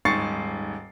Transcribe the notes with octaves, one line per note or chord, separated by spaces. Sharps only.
D#1 G#2 C#6 A6 C7 C#7